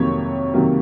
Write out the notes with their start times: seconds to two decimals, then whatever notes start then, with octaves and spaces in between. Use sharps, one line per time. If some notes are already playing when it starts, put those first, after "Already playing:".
Already playing: F2 C3 D#3 F#3 A#3 C#5
0.54 C3 D#3 F#3 A#3